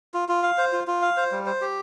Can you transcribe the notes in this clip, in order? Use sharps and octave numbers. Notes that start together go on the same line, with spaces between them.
F4
F4
F5
C5
F4
F4
F5
C5
G3
C5
G4